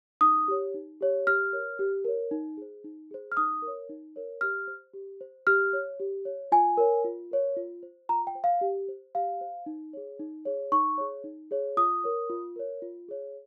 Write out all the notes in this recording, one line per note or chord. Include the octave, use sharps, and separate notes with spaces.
D#4 D#6
G4 C#5
D#4
G4 C#5
G4 F6
A#4 C#5
G4
A#4 C#5
D#4
G#4 C5
D#4
G#4 C5
F6
D#4 D#6
A#4
C#5
D#4
A#4 C#5
G4 F6
C5
G4
C5
G4 F6
C#5
G4
C#5
F4 G#5
A#4 C#5
F4
A#4 C#5
F4
C5
F4 A#5
G5
C5
F5
G4
C5
G4 F5
C5
D#4
G#4 C#5
D#4
G#4 C#5
D#4 C#6
G#4 C#5
D#4
G#4 C#5
F4 D#6
A#4 C#5
F4
A#4 C#5
F4
G#4 C#5